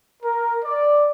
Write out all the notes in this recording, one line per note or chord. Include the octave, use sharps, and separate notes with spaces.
A#4
D5